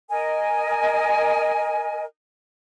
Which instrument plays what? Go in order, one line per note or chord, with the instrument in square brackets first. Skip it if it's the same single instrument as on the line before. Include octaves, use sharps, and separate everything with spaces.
[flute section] A#4 D#5 G#5